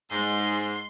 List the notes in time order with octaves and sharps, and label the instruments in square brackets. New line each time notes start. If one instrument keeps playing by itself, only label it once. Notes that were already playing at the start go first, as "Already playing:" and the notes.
[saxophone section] G#2 [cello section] G#3 [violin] C6